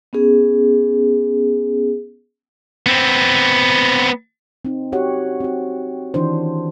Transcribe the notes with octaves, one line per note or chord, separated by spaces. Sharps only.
B3 C#4 G#4
B3 C4
C4 D#4
F#4 G4 C#5 F#5
C4 F#4
D#3 E3 D4 C5